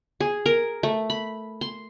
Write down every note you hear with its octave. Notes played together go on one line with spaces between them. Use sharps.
G#4
A#4
A3
B5
C6